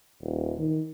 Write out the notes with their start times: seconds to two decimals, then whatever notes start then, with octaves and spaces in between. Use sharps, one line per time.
0.21 D#1
0.59 D#3